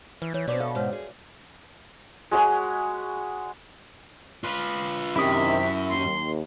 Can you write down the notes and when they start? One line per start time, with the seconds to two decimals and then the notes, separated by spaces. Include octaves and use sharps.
0.22 E3 B4
0.34 E3 C#5
0.48 B2 C4 D4 B4 D5 D6
0.60 A4 E5 F5
0.75 G#2 F#4 B4 C#5
0.93 G#4
2.31 G#3 F#4 C#5 B5
4.44 F4 B4
5.16 F#2 C3 D#3 E4 D#6 B6
5.89 D#2 C6